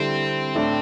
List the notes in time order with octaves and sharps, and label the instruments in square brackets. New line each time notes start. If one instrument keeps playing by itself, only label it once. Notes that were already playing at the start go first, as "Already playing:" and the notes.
Already playing: [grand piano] D3 G3 E4 [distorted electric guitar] C4
[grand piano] A2 A3 D4 A4